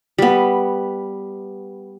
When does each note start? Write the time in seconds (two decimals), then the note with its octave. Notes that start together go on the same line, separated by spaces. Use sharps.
0.18 G3 B3